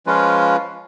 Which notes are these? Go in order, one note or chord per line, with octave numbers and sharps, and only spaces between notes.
F3 G#3 C#4 F4 B4